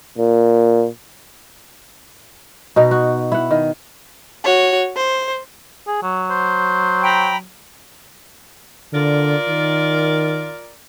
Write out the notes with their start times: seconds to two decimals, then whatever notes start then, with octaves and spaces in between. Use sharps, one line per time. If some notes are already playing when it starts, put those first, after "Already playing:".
0.18 A#2
2.76 B2 D#4
2.91 F#4
3.32 E4 F#5
3.51 D#3
4.44 F#4 C#5
4.96 C5
5.87 G#4
6.03 F#3
6.30 C5
7.03 G5 A#5 B5
8.93 D3 F4 A#4 D5
9.48 D#3